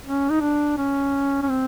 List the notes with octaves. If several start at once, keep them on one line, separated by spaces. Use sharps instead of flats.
C#4
D#4
D4
C#4
C#4
C4